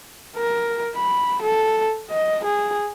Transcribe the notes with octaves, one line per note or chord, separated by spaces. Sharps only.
A#4
B5
A4
D#5
G#4